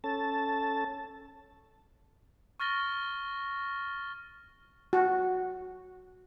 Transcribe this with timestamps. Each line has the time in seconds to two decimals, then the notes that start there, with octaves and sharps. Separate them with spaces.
0.04 C#4 A4 A5
2.60 C#6 F6 A6 A#6 G7
4.93 F#4